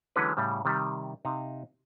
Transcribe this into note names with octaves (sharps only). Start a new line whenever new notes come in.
D3 E3 F#3 G#3 C#4 B4
A2 C#3 G3
C3 D#3 G3
C3 D#4 F5